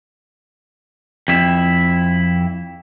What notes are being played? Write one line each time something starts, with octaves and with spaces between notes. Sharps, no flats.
F2 E4